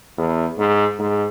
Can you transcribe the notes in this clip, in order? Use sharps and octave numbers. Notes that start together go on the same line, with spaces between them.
E2
G#2
G#2